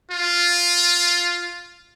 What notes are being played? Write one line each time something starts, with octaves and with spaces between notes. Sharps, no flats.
F4